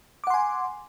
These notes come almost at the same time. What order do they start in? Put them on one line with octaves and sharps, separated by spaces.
D6 F#5 C6 G#5